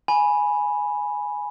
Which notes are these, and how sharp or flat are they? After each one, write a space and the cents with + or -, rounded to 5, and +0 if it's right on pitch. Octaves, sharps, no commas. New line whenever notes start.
G#5 +0 B5 -10